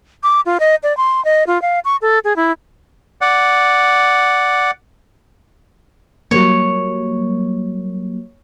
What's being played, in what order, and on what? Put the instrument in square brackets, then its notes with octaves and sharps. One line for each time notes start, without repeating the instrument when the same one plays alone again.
[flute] D6
F4
D#5
D5
C6
D#5
F4
F5
C#6
A4
G#4
E4
[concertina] D5 F#5
[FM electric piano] F#3 G3 A#3 [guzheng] C#5